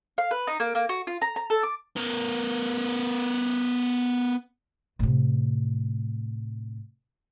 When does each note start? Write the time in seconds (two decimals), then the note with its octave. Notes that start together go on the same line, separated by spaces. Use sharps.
0.18 F5
0.31 B4
0.47 D#4
0.60 A#3
0.75 A#3
0.89 F#4
1.07 F4
1.22 A#5
1.36 A#5
1.50 A4
1.63 D6
1.96 B3 A#4
4.99 A2 C3